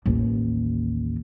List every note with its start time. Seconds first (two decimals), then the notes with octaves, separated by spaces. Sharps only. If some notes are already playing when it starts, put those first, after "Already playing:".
0.06 A1 D#2